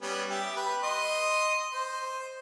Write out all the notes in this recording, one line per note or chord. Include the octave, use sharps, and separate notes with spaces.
G3 B3 C#4
G4 E5
B4
D#5 C6
C5